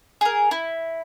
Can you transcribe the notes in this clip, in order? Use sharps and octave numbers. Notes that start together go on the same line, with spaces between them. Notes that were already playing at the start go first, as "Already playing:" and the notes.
G#4 A#4
E4